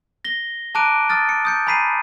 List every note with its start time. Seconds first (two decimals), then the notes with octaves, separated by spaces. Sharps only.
0.25 A#6 G7
0.75 A5 A#5 D6 F#6 D7 D#7
1.09 D#6 F6 A6
1.29 C#7
1.45 D#6 G6 C#7
1.67 G#5 A#5 B5 B6 C7 D#7